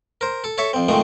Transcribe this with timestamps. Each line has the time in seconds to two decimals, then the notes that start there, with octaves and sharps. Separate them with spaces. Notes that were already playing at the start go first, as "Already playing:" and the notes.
0.21 A#4 C5
0.44 A4
0.58 A4 C#5 E5
0.73 F2 C4
0.88 F2 D#3 G#3 A3 C4